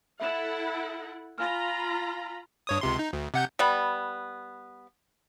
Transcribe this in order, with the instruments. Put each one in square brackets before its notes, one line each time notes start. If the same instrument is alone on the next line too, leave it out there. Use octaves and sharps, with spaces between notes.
[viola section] E4 A4 F#5 [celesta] E5 B5 E7
[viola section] F4 A#5 B5 [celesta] F5 G#5 F6
[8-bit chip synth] G2 C#5 D#6
C#2 C3 C6
D#4
D2
C3 F#5 G6
[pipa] G3 B3